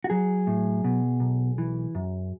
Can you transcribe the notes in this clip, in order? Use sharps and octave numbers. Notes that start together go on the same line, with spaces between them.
F#4
F#3 G#4
A2
B2
B1
E3
F#2